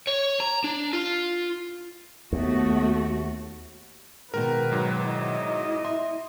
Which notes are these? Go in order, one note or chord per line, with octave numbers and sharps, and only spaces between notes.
C#5
A#5
D4
F4
D#2 A3 B3 F#4
B2 D#3 G#3 A#4 B4
G#2 F#3
E4 D#5
E5 C6